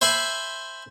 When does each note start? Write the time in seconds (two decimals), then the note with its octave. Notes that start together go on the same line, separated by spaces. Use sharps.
0.01 C5 E5 G#5 B5 C6